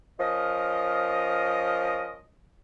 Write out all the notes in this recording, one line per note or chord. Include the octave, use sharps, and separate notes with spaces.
F3 C#4 A#4 D#5